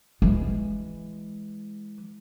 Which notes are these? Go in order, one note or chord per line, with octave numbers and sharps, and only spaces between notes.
E3 G#3